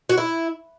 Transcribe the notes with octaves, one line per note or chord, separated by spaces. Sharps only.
F#4
E4